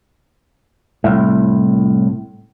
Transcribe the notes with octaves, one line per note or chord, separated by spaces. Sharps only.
C2 A2